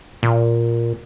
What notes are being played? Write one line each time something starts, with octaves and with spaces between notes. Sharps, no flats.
A#2